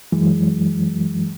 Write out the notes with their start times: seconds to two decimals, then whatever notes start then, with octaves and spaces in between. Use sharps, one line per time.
0.12 F#2 E3 F#3 G#3